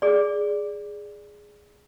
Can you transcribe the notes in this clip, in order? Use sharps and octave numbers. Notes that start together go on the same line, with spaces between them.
G#4 D5